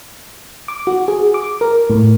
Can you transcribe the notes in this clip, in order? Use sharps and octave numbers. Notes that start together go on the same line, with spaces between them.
D6
F#4
G#4
D6
A#4
A2